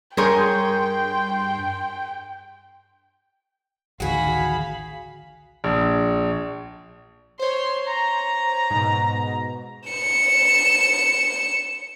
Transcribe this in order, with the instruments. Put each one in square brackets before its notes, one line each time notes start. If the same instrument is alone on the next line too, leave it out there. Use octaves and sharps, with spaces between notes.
[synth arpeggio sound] G2 C6 G6 [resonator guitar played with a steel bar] G#4 A#4 C#5 [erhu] G5
[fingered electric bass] A1 D2 D#3 [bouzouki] F#4 G#4 [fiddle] F5 B5
[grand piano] A#1
[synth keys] C5 C#5 [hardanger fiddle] C6
[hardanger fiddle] A#5
[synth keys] G#2 B2
[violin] C#7 E7